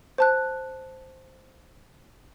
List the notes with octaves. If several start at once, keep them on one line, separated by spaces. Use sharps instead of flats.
C5 A5 F#6